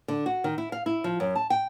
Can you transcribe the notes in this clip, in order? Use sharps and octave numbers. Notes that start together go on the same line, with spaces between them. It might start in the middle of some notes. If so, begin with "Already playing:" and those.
D3
F#4
D#3
E4
F5
E4
F3
F#2
A5
G5